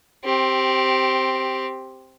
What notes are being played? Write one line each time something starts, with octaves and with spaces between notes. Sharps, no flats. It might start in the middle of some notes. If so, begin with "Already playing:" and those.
C4 G4